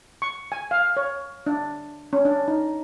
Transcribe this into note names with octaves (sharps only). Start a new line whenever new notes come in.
C#6
G#5
F5
C#5
D4
C#4
D4
D#4